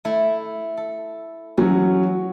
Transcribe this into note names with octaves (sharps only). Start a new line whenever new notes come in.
A3 E4
A4
E3 F#3 C#4 F#4